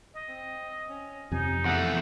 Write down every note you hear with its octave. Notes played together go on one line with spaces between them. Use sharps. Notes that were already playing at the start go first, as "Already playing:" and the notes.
D#5
C4
C#4
F2 C3 D#4 G#5
E2 A3 F#5